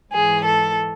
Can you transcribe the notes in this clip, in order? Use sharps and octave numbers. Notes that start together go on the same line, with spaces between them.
G#2 E3 G#4
A4